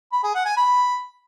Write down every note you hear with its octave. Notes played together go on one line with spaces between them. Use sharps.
B5
G#4
F#5
G#5
B5